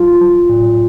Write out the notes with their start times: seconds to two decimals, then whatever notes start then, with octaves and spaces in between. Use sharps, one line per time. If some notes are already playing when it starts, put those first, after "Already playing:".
Already playing: F#3 F4
0.21 F#3
0.49 A2